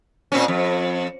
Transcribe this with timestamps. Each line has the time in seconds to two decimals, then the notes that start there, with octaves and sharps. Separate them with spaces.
0.32 A#2 C4 C#4
0.48 F2